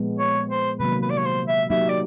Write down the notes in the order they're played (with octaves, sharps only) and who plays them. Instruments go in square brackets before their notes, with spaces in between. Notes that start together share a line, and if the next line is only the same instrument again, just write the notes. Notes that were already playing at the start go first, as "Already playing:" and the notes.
Already playing: [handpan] A#2 F3 G#3 B3
[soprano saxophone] C#5
C5
[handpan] C3 D#3 F#3 A#3 [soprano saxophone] B4
[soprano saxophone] B4
D5
C#5
C5
E5
[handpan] F#3 A#3 D#4 G4 [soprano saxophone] E5
[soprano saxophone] D5